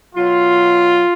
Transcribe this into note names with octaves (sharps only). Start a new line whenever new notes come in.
B2 F#3 F4